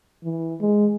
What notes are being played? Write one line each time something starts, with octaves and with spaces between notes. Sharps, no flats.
E3
G#3